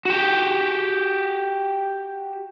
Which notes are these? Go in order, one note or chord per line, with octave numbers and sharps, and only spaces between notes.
F#4 G4